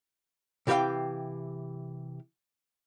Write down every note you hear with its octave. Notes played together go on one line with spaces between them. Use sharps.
C3 E3 G4 A4 F5 G5